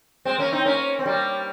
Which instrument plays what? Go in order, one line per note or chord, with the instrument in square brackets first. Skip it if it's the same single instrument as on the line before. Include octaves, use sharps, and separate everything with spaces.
[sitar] G#3 C4
A#3 C#4
C4 D#4
A#3 C#4
C4
G3 A#3